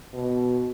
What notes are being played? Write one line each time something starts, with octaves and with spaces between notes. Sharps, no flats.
B2